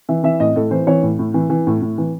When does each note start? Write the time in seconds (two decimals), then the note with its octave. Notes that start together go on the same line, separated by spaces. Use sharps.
0.09 E3 E5
0.24 E3 E5
0.40 A2 D#5
0.56 A2 A4
0.71 E3 C5
0.87 E3 C#5
1.03 A2
1.19 A2
1.34 E3
1.50 E3
1.67 A2
1.82 A2
1.98 E3